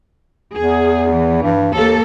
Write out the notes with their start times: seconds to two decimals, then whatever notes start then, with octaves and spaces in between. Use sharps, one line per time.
0.55 E2 G#4
1.10 E3
1.42 G2
1.74 D#2 A#3 A4